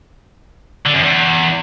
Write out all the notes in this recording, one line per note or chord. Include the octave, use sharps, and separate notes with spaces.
D3
F#2
E2